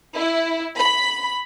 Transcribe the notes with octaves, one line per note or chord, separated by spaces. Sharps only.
E4
B5